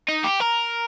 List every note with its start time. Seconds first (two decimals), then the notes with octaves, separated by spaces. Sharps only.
0.09 D#4
0.24 G4
0.40 A#4